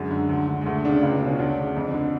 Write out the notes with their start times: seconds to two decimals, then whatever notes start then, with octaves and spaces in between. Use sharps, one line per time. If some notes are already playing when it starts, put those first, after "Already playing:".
Already playing: F#2 D3 G#3
0.11 D3
0.29 D2
0.48 D3
0.61 G#3
0.66 D2 A3
0.85 C#3 D4
1.03 C#2 F4
1.15 D4
1.21 B2
1.27 C#4
1.39 D2 D4
1.58 C#3
1.76 F2
1.94 D3